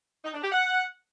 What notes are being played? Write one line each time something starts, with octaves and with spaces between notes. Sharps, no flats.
D#4
D4
G4
F#5